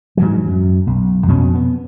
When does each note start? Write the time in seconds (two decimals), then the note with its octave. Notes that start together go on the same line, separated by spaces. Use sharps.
0.17 G#2 E3 F#3
0.47 F#2
0.87 B1
1.27 F2 B2 C#4
1.55 B3